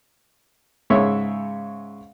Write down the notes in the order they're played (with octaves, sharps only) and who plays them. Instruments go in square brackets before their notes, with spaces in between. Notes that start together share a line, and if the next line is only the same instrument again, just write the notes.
[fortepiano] G#2 C#3 C#5 E5